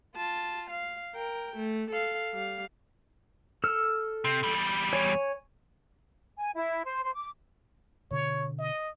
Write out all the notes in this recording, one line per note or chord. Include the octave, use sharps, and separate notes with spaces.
F4 A5
F5
A#4 G5
A3
A4 F5
G3 F5
A4 E6 F6
C3
E2 G3
C#5 G#5
G#5
E4
C5
C5
D6
B2 D3 C#5
D#5